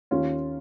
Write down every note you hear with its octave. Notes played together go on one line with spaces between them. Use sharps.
D#2 D#3 C#4 F4